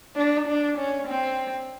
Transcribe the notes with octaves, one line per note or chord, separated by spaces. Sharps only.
D4
D4
C#4
C4